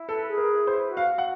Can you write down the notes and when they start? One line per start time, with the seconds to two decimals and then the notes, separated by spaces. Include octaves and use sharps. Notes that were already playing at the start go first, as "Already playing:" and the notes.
Already playing: E4
0.08 A4 B4
0.29 G#4
0.38 A#4
0.48 E4
0.67 B4 C5
0.88 F#4
0.97 F5
1.07 F#4
1.18 F#5